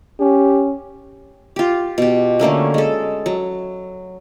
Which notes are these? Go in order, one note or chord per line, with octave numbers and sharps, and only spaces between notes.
C#4 G4
F4 G4
B2 G4
D3 A3 A#3 C#4
G#3 A4
F#3